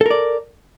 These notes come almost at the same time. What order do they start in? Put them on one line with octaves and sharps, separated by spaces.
A4 A#4 D5